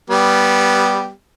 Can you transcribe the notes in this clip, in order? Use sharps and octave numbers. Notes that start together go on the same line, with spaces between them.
G3 B3 G4